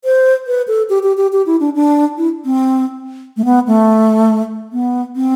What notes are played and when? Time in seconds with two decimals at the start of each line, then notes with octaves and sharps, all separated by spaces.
0.05 C5
0.47 B4
0.68 A4
0.90 G4
1.03 G4
1.17 G4
1.32 G4
1.46 E4
1.60 D4
1.75 D4
2.18 E4
2.45 C4
3.37 A3
3.45 B3
3.67 A3
4.72 B3
5.16 C4